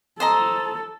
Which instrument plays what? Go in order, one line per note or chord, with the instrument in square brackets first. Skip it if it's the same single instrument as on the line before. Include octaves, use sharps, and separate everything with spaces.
[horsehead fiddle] A4 [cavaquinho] C5 D#5 A#5